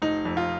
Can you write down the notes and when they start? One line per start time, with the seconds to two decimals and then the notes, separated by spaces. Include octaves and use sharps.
0.02 F1 D#4
0.25 F2
0.37 F4